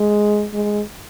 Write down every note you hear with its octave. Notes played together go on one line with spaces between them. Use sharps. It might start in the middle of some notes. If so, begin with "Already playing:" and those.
Already playing: G#3
G#3